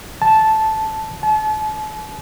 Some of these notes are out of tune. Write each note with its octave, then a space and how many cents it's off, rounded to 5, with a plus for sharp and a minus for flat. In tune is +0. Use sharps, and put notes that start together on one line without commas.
A5 -10
A5 -40